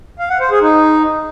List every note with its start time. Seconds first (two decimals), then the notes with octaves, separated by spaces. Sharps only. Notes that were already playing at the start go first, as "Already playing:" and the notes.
0.19 F5
0.30 F#5
0.40 C5
0.51 G#4
0.61 D#4